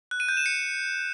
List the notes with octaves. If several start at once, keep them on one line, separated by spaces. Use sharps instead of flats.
F#6
D#7
G6
E7
C#7